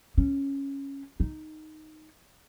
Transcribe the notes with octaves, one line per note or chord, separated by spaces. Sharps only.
C#4
D#4